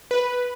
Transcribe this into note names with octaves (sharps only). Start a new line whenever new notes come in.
B4